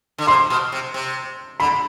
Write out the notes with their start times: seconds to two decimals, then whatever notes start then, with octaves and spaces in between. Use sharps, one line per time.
0.18 D3
0.27 C3 C6
0.50 B2
0.72 C3
0.94 C3
1.60 D3 B5